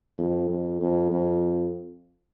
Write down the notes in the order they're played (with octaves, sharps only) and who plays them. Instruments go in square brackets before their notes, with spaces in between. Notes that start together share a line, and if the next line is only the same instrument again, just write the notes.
[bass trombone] F2
F2
F2
F2